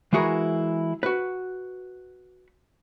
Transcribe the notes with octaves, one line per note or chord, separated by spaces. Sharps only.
E3 G#3 E4 F#4 G#4 A#4
F#4 B4